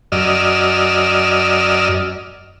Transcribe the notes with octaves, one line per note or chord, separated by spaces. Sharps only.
F#2 D5 D#5 E6 F6